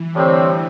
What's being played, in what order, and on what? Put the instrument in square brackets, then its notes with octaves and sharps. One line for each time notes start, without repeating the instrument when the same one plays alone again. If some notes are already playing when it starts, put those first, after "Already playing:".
Already playing: [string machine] E3
[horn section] A2 G3 C4 [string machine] D3